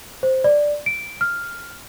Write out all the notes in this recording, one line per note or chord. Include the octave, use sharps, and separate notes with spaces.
C5
D5
D7
F6